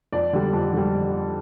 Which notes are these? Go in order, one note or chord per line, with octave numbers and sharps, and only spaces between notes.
F2 D5
D3 G3
F2
D3 G3